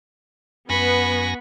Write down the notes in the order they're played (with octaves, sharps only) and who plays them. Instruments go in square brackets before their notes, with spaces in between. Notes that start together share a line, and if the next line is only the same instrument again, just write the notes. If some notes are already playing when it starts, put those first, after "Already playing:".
[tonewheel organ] F#2 G#5 A#6 [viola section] B3 [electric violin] B5 C#6